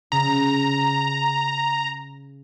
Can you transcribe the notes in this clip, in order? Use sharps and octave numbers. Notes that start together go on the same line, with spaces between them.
C#3 A#5